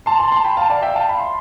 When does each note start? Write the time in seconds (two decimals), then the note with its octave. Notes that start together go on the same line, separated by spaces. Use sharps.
0.06 A5 C6
0.19 A5 C6
0.32 A5 C6
0.44 G5 B5
0.57 F5 A5
0.70 D5 F5
0.82 E5 G5
0.96 F5 A5
1.09 B5
1.18 C6